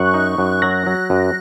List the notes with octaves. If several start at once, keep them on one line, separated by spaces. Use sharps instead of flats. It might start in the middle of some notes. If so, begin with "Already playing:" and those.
Already playing: F#2 C#6 F#6
D#4
F#2
F#3 F#6 A#6
F#3
F#2